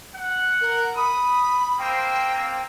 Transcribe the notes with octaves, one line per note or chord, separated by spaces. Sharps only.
F#5
A#4
B5 D#6
A#3 C4 C5 G5
A#3 C4